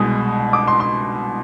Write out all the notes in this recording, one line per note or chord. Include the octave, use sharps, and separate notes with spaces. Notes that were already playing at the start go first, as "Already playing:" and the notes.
Already playing: C2 B2 G#3 D#6
D6
C6
C6